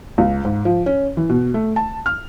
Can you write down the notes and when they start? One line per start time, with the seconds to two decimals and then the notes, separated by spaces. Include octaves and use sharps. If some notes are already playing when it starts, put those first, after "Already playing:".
0.18 C#2
0.45 G#2
0.65 F3
0.86 C#4
1.17 E3
1.29 B2
1.54 A3
1.76 A5
2.06 F6